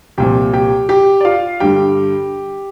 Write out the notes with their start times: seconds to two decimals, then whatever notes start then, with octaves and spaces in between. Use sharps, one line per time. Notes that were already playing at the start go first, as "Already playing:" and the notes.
0.18 C2 A#2 F3 G4 G5
0.53 G4 G5
0.89 G4 G5
1.21 D5
1.25 F4 F5
1.60 G2 D3 G3 G4 G5